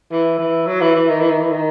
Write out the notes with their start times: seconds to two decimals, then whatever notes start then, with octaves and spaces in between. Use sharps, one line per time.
0.11 E3
0.38 E3
0.67 F#3
0.81 E3
0.95 E3
1.09 D#3
1.20 E3
1.30 D#3
1.41 E3
1.51 D#3